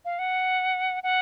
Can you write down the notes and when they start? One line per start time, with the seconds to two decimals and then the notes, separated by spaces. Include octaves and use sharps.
0.05 F5
0.19 F#5
1.03 F#5